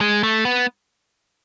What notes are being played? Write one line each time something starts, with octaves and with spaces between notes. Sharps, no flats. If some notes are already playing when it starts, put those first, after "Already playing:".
G#3
A3
B3